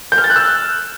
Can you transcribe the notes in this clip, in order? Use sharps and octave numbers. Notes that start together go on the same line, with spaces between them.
G6
F6
A6
F#6
E6